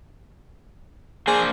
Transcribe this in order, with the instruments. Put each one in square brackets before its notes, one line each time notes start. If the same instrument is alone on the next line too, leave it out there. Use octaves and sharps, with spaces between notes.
[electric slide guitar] A#3 D4 C5 [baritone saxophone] G#4